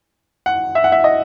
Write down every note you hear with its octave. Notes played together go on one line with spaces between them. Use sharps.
F#5
E5
F#5
E5
D#5